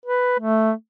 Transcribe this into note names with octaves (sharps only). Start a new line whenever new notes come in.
B4
A3